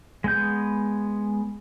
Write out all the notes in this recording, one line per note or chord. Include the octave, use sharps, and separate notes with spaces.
G#3 B3 G6